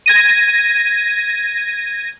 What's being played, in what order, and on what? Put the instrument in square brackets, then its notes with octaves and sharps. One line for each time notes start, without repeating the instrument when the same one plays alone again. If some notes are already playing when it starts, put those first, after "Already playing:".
[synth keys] G#6 A#6 D#7